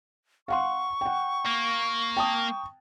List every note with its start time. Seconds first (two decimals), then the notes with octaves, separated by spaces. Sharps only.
0.48 F5 F#5 C6 C#6
1.01 F#5 G5
1.46 A#3
2.17 G5 A5 D#6